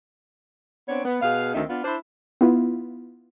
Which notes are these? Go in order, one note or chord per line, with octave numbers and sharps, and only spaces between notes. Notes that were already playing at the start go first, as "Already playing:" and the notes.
B3 C4 D4 C#5
B3
B2 G#4 B4 F5
D2 D#3 C4 D#4 E5
B3 D4 F4
D4 E4 C5
B3 E4 F4